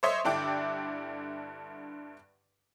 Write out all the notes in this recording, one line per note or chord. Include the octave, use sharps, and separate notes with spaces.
C5 C#5 D#5 E5 C6
G2 D3 D4 E4 G5 D6